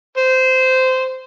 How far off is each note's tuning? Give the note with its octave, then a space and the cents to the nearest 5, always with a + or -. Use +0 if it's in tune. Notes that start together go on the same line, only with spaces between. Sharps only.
C5 -15